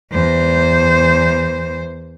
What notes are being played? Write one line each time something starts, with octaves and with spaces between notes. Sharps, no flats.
E2 C5